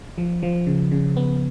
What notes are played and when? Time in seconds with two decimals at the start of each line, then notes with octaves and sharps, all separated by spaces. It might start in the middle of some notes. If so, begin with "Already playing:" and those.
0.18 F3
0.43 F3
0.66 C#3
0.91 C#3
1.16 B3